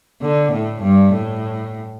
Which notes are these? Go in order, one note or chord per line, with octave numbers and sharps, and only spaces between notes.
D3
A2
G2
A2